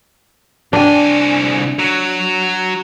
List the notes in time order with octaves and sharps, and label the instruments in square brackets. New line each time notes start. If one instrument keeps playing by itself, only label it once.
[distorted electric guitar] C2 G#5 [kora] D4 G5
[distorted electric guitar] F#3